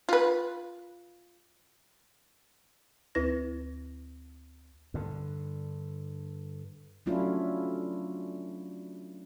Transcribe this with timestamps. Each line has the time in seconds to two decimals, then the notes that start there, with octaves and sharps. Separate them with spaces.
0.09 F4 B4
3.15 D2 E4 B4 A#6
4.94 G2 D3
7.06 F#3 A3 C#4 D4 E4 F4